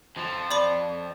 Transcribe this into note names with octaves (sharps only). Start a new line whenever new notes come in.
F2 F3
D5 B5 D6